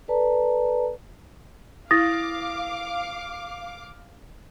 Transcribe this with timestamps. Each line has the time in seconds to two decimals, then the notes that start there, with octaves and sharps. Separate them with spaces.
0.08 A4 B4 D5 A5 A#5
1.91 E4 F5 D6 D#6 A6 A#6